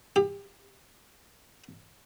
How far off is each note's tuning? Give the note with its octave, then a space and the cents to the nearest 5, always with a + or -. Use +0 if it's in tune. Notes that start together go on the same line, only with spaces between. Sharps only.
G4 +30